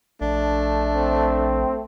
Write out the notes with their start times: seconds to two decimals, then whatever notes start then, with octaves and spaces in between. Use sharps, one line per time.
0.21 A#1 A3 D4
0.94 C4